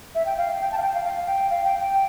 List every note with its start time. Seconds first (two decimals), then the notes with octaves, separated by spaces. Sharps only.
0.15 E5
0.26 G5
0.37 F5
0.61 G5
0.72 A5
0.78 F5
0.82 G5
0.94 F5
1.04 F5
1.27 G5
1.50 F5
1.65 G5
1.79 G5